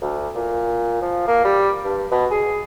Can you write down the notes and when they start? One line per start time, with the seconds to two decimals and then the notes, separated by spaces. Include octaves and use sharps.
0.01 D2
0.36 A#2
1.02 F3
1.27 A#3
1.45 G3
1.84 G2
2.11 B2
2.31 G#4